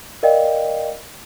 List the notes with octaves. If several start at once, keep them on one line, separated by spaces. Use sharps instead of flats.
A#4 D5 D#5 F5 G5